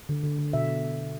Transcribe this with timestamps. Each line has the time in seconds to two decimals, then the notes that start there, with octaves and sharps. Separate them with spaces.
0.09 D3
0.24 D3
0.39 D3
0.53 B2 E5